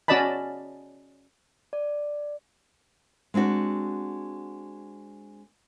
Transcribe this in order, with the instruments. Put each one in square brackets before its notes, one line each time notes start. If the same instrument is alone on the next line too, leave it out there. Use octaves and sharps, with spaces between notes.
[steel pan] C#4 F#4 D5 D#5 A5 B5
[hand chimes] D5
[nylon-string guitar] G#3 C4 D4 F#4